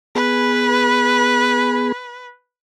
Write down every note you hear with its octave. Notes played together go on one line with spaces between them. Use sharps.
B3 G#4 B4 B5